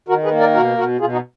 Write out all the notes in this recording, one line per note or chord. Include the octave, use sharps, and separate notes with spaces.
D#3 F#4 A#4
G#4 B4
A#3
A#4 D5
B2 F#4 A#4
B2 F#4 A#4
B2 F4 G#4
D#4 F#4